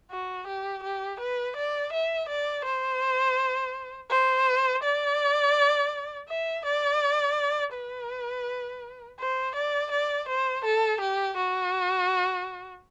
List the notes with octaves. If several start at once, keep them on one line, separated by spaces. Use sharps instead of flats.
F#4
G4
G4
B4
D5
E5
D5
C5
C5
D5
E5
D5
B4
C5
D5
D5
C5
A4
G4
F#4